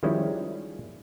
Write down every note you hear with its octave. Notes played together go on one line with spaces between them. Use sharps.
D#3 F3 G3 G#3 C#4 E4